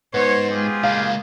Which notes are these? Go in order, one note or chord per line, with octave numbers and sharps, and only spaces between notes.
G#2 B3 C5 C#5
G#3 F4 G4 G#4
C#2 A#2 F5